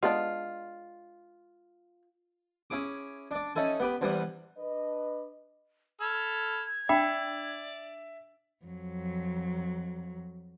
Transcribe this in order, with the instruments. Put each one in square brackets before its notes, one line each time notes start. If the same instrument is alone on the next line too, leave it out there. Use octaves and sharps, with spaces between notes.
[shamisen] G#3 B3 D4 [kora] F4
[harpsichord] C#4 E4 G#4 D6
D4 D5
C#4 D#4 E4 A4 G#5
B3 G4 B4
E2 C3 E3 G3 B3
[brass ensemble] D4 B4 D#5
[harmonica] A4 B5 F6 [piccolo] G#6
[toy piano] D4 G5 B5 [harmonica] D5 [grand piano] E5
[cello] F2 F#3